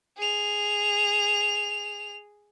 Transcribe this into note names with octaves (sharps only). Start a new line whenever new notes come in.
G#4 F7